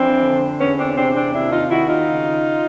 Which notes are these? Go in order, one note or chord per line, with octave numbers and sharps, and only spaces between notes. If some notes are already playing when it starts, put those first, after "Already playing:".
Already playing: F2 E3 C4 D4
D3
E2 B3 C#4
C4 D4
C3 C4 D4
C4 D4
D#2 D4 E4
D#4 F4
D#3 E4 F#4
D#4 F4
C#3